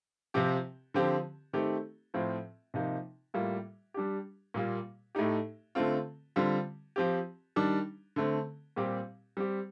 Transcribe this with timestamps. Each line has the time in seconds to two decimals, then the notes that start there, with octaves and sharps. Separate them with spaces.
0.34 C3 F3 C4 G4
0.94 D3 F3 C4 G4
1.53 D#3 A3 C4 G4
2.14 A2 F3 C4 F4
2.74 C3 F3 A#3 D#4
3.34 A2 G3 A#3 F4
3.94 G3 D4 G4
4.54 A#2 G3 A#3 F4
5.15 A2 A3 D#4 G4
5.75 D3 A3 C4 F4
6.36 D3 G3 C4 F4
6.96 F3 C4 G4
7.56 D#3 G3 D4
8.16 D3 A3 C4
8.76 A#2 G3 C4 G4
9.37 G3 C4 G4